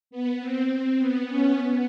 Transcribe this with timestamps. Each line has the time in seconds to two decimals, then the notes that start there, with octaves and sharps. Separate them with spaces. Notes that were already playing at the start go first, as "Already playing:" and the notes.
0.11 B3
0.40 C4
0.69 C4
0.98 B3
1.27 C#4
1.57 B3